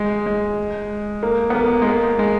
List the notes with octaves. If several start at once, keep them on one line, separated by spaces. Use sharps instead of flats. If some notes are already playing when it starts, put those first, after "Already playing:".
Already playing: G#3
G#3
A#3
B3
A#3
G#3
A#3
G#3